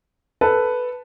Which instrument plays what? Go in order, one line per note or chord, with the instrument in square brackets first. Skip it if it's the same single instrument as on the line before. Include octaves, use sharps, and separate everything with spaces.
[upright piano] A4 B4